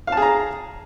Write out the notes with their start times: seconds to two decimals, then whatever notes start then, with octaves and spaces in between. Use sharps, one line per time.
0.07 F5
0.12 A5
0.17 G#4
0.22 A#5